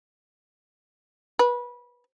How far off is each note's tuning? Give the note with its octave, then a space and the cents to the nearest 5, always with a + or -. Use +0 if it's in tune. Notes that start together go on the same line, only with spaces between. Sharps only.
B4 -25